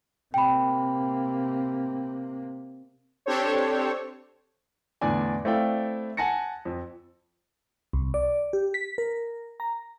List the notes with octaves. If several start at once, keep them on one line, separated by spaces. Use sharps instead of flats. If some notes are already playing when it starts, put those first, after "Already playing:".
C3 A#3 G5 B5
C4 D4 G4 A4 C5 C#5
E2 A2 D3 D4 D5 G#5
A3 C4 E4 D5 F5 G5
F#5 G#5 A5 A#6 C#7
F2
C2
D5
G4
B6
A#4
A#5